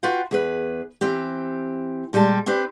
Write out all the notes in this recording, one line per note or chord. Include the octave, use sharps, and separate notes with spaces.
F4 F#4 B4 F5 G5
E2 G#4 B4
E3 C4 G4
A#2 G3 G#3 G4 A5
C4 D4 G4 B4